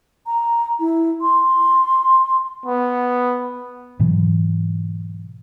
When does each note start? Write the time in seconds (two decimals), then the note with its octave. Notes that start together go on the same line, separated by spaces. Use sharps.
0.26 A#5
0.80 E4
1.21 C6
2.66 B3
3.99 G#2 B2 E3 F#3